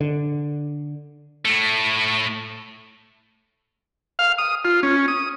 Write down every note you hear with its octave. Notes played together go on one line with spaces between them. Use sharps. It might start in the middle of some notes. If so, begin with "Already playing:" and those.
D3
A2 A3
F5
D#6
F4
C#4
D#6